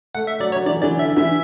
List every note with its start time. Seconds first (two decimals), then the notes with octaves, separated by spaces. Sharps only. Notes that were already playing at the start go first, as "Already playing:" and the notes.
0.15 A3 F#5
0.27 E5
0.40 F#3 D5
0.52 C#5
0.56 F#3
0.66 E3 D5
0.82 E3 D5
0.99 D3 E5
1.17 E3 E5